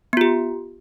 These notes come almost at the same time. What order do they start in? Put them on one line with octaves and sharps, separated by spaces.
B3 F4 G4